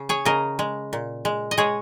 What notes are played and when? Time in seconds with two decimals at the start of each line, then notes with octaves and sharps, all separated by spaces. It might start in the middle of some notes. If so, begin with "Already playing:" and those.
Already playing: C#3
0.09 G#4 C#5
0.25 C#3 A#4 D#5
0.59 G#3
0.93 A#2
1.25 G#3
1.51 D#5
1.58 G#3 G#4 C#5